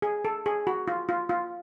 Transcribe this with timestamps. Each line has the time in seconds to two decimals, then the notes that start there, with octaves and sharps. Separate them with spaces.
0.02 G#4
0.25 A4
0.46 G#4
0.67 F#4
0.88 F4
1.09 F4
1.29 F4